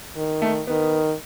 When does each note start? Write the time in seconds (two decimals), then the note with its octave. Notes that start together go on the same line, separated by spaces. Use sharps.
0.17 D#3
0.42 A3
0.67 D#3 B3